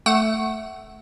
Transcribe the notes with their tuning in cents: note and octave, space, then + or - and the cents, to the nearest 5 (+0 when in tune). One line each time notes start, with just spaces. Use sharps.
A3 +0 F#5 +20